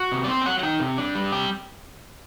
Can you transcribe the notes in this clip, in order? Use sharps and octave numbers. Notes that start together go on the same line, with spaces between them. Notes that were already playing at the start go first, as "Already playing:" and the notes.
Already playing: F#4
C3
D5
C4 C5
G5
F#3 F#5
F#5
D#4 G5
C3
D4
G3
C3 G5